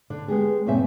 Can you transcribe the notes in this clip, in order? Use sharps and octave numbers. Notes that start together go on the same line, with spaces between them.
D3 D4
G#3 B3 G4 G#4
G2 A#2 C#3 C4 E5 G#5